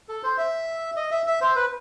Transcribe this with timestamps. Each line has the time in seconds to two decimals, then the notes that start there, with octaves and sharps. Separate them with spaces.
0.09 A4
0.23 C5
0.38 E5
0.97 D#5
1.11 E5
1.26 E5
1.41 C5
1.56 B4